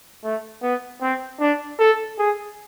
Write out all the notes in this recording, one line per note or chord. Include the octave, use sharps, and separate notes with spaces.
A3
B3
C4
D4
A4
G#4